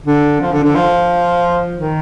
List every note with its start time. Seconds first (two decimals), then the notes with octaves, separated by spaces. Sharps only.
0.06 D3
0.40 F3
0.52 D3
0.63 D3
0.75 F3
1.77 D#3